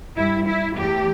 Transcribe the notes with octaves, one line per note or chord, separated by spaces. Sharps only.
G2 G3 E4
E4
E2 E3 A3 G4